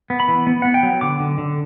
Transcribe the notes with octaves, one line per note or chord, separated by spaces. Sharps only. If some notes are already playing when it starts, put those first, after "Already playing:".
B3
B5
E3
B3
B3 F#5
G5
F#3
D3 D6
D3
D3